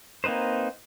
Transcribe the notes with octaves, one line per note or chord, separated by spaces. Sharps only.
A#3 C4 D#4 B4 C5